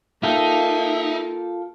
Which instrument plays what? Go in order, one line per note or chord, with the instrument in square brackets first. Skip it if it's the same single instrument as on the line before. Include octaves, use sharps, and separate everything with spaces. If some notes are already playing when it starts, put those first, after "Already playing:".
[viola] A#3 [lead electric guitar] D#4 [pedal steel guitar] F4 A4 G5 [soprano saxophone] E5